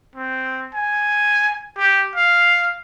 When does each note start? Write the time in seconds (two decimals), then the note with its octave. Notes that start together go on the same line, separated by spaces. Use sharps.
0.15 C4
0.74 G#5
1.77 G4
2.15 F5